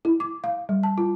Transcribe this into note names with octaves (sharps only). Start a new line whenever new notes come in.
E4
D6
F5
G3
A5
F4